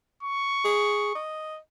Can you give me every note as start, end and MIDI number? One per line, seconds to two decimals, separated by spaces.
0.23 1.22 85
0.65 1.11 68
1.15 1.58 75